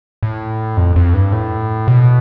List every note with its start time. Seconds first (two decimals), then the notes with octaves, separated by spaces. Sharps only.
0.23 A2
0.77 F2
0.96 F2
1.14 G2
1.32 A2
1.88 B2